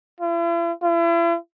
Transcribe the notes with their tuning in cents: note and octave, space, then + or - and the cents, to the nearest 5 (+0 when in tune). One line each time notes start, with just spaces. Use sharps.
E4 +45
E4 +40